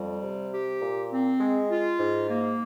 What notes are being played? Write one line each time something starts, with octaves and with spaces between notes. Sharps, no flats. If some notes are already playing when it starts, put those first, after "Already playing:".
Already playing: F2 G3
C3
G4
A#2
C4
G#3
F4
G#2
A#3